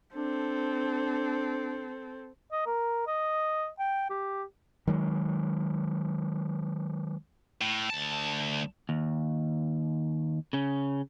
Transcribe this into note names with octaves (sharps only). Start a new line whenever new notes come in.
C4 D4 A4
D#5
A#4
D#5
G5
G4
D#3 F#3 G#3
A2
D2 A5
D#2
C#3 C#4